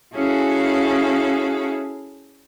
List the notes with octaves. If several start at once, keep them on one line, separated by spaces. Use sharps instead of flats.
C#4 E4 F#4 G#4 A4 F5